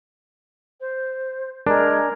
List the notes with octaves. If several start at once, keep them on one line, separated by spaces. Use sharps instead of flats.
C5
G#3 D4 A#4